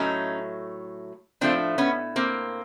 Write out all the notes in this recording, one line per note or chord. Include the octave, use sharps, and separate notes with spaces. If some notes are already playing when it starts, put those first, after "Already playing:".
Already playing: A2 F#3 A3 C#4 D#4
A2 F3 A3 C4 D4
B3 C#4
A#3 C4